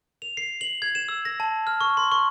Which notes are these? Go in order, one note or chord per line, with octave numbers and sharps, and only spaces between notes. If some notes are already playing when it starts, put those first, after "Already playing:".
F7
C7
F#7
G#6
E7
E6
A#6
A5
F6
C#6
C6
C#6